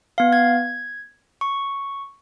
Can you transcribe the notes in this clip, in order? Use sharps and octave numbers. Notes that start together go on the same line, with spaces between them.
B3 F5
G#6
C#6